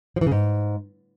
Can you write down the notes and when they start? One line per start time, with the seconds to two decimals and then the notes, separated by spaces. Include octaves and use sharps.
0.16 F3
0.21 E3
0.26 C#3
0.32 G#2